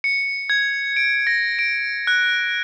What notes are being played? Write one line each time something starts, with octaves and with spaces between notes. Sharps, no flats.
C#7
G#6
D7
A#6
D7
F#6